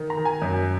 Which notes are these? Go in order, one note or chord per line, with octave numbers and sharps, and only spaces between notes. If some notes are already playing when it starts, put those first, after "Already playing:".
Already playing: D#3
A#5
D#3
G#5
F#2